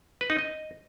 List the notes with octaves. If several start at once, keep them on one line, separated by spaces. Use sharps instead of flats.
B4
D#4
D#5